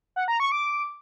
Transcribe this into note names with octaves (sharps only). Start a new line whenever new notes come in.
F#5
A#5
C#6
D6